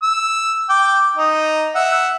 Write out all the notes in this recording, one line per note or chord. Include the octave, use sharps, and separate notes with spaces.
E6
G5 D6
D#4 D#5
E5 F#5